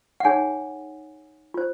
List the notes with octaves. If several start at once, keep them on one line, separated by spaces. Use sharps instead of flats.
F#5
D#4 G#4 C#5 G#5
F4 C5